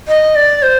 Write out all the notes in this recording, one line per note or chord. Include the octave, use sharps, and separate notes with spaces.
D#5
D5
C5